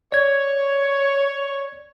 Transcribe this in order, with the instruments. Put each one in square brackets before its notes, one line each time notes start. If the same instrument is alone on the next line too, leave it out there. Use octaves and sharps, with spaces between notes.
[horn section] C#5 [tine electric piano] D5 G#6